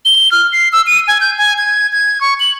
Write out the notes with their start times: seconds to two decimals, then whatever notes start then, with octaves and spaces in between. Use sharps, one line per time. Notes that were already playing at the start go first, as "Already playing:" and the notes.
0.05 G7
0.32 F6
0.53 C7
0.73 E6
0.87 D#7
1.08 G#5
1.21 G6
1.38 G#5
1.58 G#6
1.92 G#6
2.21 C#6
2.40 F#7